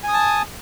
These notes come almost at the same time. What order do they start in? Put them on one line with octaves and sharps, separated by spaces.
G#5 D#6 A5